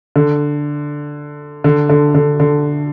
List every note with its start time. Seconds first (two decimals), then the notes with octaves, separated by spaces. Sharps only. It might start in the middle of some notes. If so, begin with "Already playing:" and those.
0.16 D3
1.64 D3
1.90 D3
2.15 D3
2.40 D3